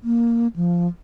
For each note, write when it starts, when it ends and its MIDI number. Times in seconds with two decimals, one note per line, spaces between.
0.04 0.48 58
0.56 0.88 53